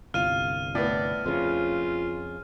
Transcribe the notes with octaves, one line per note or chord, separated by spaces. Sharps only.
G1 C2 F4 F6 D#7
A2 B3 D5
F2 C#3 F4